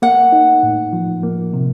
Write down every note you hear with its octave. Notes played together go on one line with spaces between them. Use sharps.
A#3 F#5
D#4
A2
F3
A#3
C3